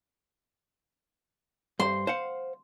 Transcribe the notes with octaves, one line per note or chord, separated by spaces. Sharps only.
G2 C5 C6
C5 F5 F#5